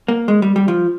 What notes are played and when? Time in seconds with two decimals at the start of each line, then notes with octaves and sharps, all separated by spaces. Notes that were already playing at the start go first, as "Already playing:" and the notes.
0.08 A#3
0.28 G#3
0.42 G3
0.56 G3
0.68 F3